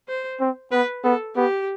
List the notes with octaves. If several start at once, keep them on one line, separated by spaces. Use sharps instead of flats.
C5
C4
B3 B4
B3 A4
B3 G4